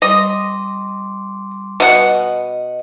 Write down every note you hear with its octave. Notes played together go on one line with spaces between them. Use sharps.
G3 D#5 C6 D6
B2 D#5 F#5